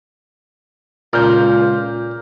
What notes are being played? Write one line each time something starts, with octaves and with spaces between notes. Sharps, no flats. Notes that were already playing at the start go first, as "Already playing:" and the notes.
C#2 A#2 F4 F6 G6